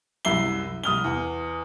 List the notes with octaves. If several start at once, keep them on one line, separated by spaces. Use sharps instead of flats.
C2 F#2 E4 E5 C7 G7
C2 D#6 F6 G7
E2